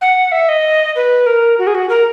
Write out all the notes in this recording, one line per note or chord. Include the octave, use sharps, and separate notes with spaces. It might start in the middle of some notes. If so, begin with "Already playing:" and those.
F#5
E5
D#5
B4
A#4
F#4
G#4
F#4
A#4